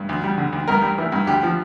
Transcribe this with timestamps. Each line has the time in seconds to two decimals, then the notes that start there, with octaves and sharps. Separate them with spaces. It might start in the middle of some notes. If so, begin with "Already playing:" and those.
Already playing: G2
0.09 D2
0.24 G3
0.38 D3
0.53 D2
0.68 G2 A#4
0.82 G3
0.98 E3
1.12 G2
1.27 D2 G4
1.43 F3